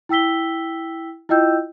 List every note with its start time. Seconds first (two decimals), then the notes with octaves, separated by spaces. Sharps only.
0.09 E4 G5 E6 B6 G7
1.29 E4 F4 D#5 G5 E6 G6